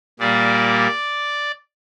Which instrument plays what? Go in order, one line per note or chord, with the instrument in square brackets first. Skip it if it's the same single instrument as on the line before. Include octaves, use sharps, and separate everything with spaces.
[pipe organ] A#2 G3 A#3 D5